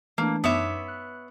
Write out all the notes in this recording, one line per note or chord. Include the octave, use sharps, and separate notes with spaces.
E3 A3 A#3 D4
F#2 B3 D#4 C#5 E5 D6
F#6